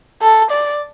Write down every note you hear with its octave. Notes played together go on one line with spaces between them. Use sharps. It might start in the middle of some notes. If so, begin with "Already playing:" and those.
A4
D5